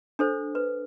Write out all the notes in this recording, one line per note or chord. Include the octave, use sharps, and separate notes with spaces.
D4 A4 C5
B4